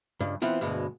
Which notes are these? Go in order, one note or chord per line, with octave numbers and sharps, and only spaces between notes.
C#2 G2
E3 B3 C4 F4
D2 G2 B2 G#3